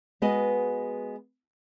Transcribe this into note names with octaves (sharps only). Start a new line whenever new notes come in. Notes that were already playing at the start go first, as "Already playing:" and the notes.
G#3 B3 F#4 B4 D#5